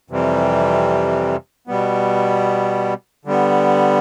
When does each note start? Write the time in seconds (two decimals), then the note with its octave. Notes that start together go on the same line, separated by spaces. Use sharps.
0.10 F2 C3 E3 G3
1.67 B2 G3 B3
3.25 D3 G3 B3